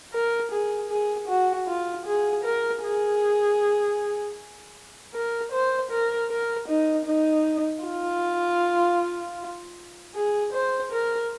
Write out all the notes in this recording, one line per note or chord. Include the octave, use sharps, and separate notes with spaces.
A#4
G#4
G#4
F#4
F4
G#4
A#4
G#4
A#4
C5
A#4
A#4
D#4
D#4
F4
G#4
C5
A#4